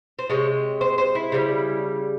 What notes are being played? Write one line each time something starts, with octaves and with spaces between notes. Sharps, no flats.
C5
C3 F3 G#3 C#5
C5
C5
E4
C#3 G3